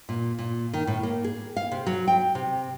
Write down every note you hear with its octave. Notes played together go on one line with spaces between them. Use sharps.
A#2
A#2
D#3
A2
A#3
G#4
F5
C3
F#3
G5
C3